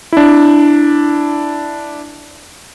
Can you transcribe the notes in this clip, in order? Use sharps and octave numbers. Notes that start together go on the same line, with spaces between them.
D4 E4